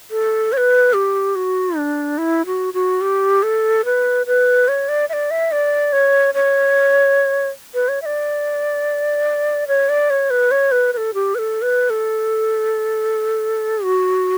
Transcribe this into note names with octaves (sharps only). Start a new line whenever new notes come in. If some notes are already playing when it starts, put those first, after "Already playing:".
A4
C#5
B4
G4
F#4
D4
E4
F#4
F#4
G4
A4
B4
B4
C#5
D5
E5
D5
E5
D5
C#5
C#5
B4
C#5
E5
D5
C#5
D5
C#5
B4
C#5
B4
B4
A4
G4
B4
A4
B4
A4
F#4